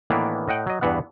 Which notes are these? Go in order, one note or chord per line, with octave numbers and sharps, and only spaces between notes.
A2 D#3 E3 A#3 B3 D4
A2 D#5 F#5 G5
F#3 D#5
E2 G2 E3 B3 F#5